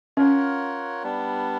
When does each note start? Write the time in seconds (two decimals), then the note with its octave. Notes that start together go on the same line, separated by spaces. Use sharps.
0.17 C#4 F4 A#4 C#5 F#5
1.03 G3 B3 D4